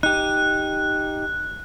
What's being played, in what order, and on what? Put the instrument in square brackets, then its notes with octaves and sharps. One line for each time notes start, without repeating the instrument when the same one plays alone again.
[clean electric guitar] D#4 G4 [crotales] F#6